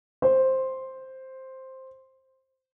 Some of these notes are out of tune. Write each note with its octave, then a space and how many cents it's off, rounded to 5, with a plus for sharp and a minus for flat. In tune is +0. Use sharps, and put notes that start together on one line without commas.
C5 +5